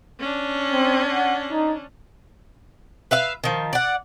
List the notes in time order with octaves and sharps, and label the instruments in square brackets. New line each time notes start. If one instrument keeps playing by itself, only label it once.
[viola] C#4 D4
[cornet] C4
F#5
D#4
[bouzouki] B4 E5 F5
D#3 F3
D5 F#5